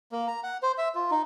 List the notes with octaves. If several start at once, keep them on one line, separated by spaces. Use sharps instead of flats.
A#3
A#5
F#5
C5
E5
F4
D#4